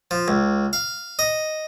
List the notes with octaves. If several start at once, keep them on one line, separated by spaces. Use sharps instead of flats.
F3
C#2
F5
D#5